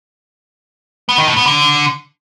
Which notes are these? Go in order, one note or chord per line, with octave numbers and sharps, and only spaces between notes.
B3
D#3
A2
B3
D3